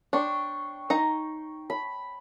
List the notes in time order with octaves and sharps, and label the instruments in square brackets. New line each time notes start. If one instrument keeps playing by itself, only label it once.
[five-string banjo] D4 [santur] G5 C6 C#6
[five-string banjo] D#4 A#5
[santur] B5